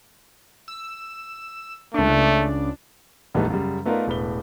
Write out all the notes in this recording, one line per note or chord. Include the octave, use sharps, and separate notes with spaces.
E6
C#2 A3 D4
A#1 E2 G3 A3 B3 D#4
F#2 C#3 G3
A3 B3 D#4 F4 A#4 D5
E1 A2 B4 G7